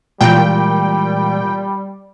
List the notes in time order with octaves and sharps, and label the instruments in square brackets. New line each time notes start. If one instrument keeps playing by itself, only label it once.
[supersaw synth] A#2 G5 [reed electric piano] E3 G#3 [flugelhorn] G3